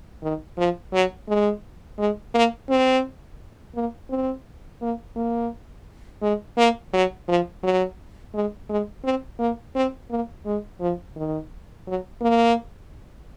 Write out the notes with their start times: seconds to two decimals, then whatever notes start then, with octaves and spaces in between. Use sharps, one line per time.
0.23 D#3
0.58 F3
0.93 F#3
1.28 G#3
1.98 G#3
2.34 A#3
2.69 C4
3.76 A#3
4.10 C4
4.82 A#3
5.16 A#3
6.22 G#3
6.57 A#3
6.93 F#3
7.28 F3
7.63 F#3
8.34 G#3
8.69 G#3
9.04 C4
9.39 A#3
9.75 C4
10.10 A#3
10.46 G#3
10.81 F3
11.16 D#3
11.87 F#3
12.22 A#3